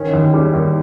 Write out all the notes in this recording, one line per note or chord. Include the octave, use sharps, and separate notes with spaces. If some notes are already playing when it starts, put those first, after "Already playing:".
Already playing: D#3 C#4
D#2
G3
D#2